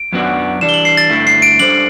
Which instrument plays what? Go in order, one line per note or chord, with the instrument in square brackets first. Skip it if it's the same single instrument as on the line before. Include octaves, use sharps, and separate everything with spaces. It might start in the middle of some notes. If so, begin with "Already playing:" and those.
Already playing: [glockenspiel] D7
[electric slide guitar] F#2 F#3 B3 D4 F#4
[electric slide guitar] E3 G3 D4 [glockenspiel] E7
[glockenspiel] G7
F#7
C7
A6
[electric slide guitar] G2 D3 A3 E4
[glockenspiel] C7
D7
[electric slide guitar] G3 D4 A4 C5 [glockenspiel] F#7